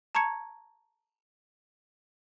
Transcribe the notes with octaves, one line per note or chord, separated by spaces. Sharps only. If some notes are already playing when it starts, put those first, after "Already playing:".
A5 A#5 C#6 G#6 C#7